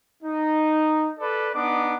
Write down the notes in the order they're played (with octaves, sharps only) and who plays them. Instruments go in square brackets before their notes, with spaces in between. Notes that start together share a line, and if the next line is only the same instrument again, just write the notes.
[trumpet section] D#4
A4 B4 D5
B3 D4 D#4 D#5 D6